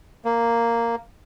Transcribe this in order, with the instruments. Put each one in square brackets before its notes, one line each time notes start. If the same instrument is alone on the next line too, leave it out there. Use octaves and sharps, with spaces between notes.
[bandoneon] A#3